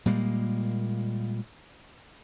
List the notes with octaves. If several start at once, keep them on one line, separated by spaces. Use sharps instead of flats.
A#2 G3 G#3 A#3